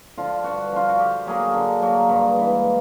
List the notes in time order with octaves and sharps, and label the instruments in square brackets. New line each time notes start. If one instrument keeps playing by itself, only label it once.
[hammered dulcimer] D3 F3 F4
G2 F#4
D3 F3 F4
F#4
D3 G4
F#3 A#3 G#4
D3
F#3 A#3
G2
E3 G#3